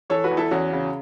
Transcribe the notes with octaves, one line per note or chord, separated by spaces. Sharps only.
E3 A4 C#5
F#4 B4
E2
E4 A4
E2 C#4 F#4
C#3